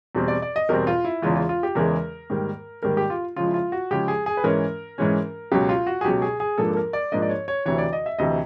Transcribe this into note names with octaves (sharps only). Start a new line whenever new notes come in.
E2 B2 G3 C4
D5
D5
D#5
E2 B2 G3 C4 A#4
F4
E4
E2 C#3 E3 G#3 F4
F4
F4
G4
E2 C#3 E3 G#3 A#4
G#2 D#3 G3 A#3
G#2 D#3 G3 A#3 A#4
G4
F4
C#3 F3 G#3 F4
E4
F4
F#4
C#3 F3 G#3 G4
G#4
G#4
B4
G#2 E3 G#3 C#4 A#4
G#2 E3 G#3 C#4
C#2 B2 F#3 G4
F4
F#4
G#4
C#2 B2 F#3 G4
G#4
G#4
G#2 F3 A#3 D4 A4
A4
A#4
D5
G#2 F3 A#3 D4 D#5
D5
C#5
C#5
D2 C3 E3 C#5
D5
D#5
E5
D2 C3 E3 D#5